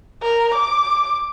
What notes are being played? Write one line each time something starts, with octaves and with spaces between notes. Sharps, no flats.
A#4
D6